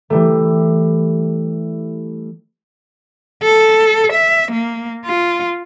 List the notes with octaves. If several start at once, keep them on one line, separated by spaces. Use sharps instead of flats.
E3 G3 A3
A4
E5
A#3
F4